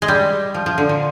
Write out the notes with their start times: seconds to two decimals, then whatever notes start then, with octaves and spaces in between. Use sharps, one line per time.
0.02 G#3
0.08 G3
0.54 F3
0.66 F3
0.78 D3
0.89 A#2